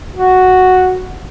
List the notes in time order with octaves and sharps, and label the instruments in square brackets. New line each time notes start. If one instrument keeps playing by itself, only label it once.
[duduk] F#4